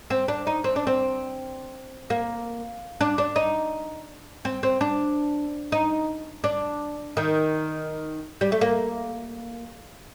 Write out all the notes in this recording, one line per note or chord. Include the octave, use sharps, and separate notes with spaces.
C4
D4
D#4
C4
D4
C4
A#3
D4
D4
D#4
C4
C4
D4
D#4
D4
D#3
G3
A3
A#3